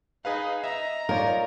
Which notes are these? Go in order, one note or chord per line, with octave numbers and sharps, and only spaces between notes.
D#4 G#4 B4 F5
D#5 E5 A#5
D#4 F4 A#4 C#5 D5